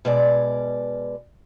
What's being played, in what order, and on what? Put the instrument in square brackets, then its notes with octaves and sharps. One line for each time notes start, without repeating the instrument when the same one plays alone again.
[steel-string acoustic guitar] B2 G#3 D5